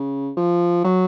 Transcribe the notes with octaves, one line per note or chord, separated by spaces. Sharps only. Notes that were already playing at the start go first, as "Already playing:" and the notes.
Already playing: C#3
F3
F#3